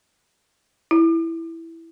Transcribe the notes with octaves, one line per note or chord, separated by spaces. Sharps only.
E4